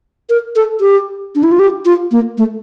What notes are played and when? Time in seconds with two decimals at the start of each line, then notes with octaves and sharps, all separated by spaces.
0.29 A#4
0.56 A4
0.81 G4
1.35 D4
1.43 E4
1.52 F4
1.59 G4
1.85 F4
2.11 A#3
2.38 A3